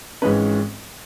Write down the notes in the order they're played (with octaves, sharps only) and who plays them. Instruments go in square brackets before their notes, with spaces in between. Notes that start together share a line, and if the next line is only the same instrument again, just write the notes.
[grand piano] G#1 G#2 E3 G#3 C#4 B4